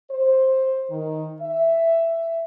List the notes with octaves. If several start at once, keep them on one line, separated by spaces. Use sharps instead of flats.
C5
D#3
E5